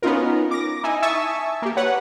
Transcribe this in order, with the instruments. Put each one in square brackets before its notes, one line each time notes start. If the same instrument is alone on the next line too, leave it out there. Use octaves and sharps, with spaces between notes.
[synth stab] B3 C#4 D#4 F4 A#4
D6 A#6
D#4 E4 G#5
E5 G#5 A5 C#6 D#6 E6
A#3 G4
B4 C#5 F#5